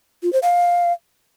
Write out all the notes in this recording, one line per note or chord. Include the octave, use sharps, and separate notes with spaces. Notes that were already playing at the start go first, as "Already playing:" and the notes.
F4
C5
F5